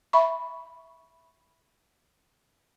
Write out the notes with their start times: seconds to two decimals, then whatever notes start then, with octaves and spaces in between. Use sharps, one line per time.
0.13 E5 B5 C#6